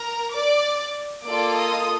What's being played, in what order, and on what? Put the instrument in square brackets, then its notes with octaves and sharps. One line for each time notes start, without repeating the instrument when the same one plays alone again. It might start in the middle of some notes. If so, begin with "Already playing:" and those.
Already playing: [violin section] A#4 A#5
D5 D6
A#3 F4 A4 D5 D6
D#5 D#6